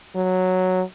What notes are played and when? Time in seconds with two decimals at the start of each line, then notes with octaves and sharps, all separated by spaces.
0.16 F#3